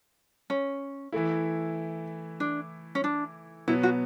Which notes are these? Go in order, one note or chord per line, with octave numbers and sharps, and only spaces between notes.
C#4
E3 A3 E4
D4
C#4
D4
B2 F#3 B3 E4
F#4